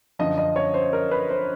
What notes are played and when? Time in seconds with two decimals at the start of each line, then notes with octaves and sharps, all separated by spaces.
0.19 F#2 D3 F3 D#5
0.38 D#5
0.56 C#5
0.74 C5
0.93 A#4
1.11 B4
1.30 C5